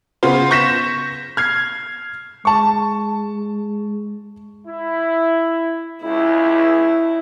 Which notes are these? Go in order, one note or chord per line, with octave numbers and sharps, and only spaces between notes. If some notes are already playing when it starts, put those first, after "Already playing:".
C#3 B3 F4 C5
C#6 G6 A#6 B6 E7
F6 G#6 C7
G#3 A5 C#6
E4
C#2 E4